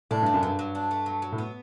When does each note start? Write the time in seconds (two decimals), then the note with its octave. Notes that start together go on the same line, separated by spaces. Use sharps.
0.11 A2 D4
0.22 G2 A3
0.34 F#2
0.43 G2 F#3
0.59 F#3
0.75 D4
0.91 A3
1.06 F#3
1.22 F#3
1.32 A2
1.38 B3